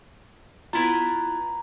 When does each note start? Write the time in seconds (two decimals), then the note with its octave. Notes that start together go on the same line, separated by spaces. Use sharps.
0.73 B3 E4 F4 A#5 B5